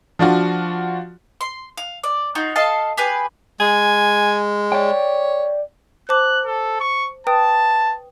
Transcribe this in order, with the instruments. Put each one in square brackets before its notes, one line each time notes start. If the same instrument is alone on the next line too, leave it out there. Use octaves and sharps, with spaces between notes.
[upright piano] F3 D4 F4 F#4
[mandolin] C6
F5
D5
D#4 F4 F#4 C#5
A4 D#5 F5 A5
G4 G#4 B4 G#5
[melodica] G#3 [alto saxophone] G#5
[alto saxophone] C#5 [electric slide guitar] D5 G5
[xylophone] C5 A5 D6 [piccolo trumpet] F#6
[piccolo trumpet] A4
C#6
[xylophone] B4 G5 D#6 [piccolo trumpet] A5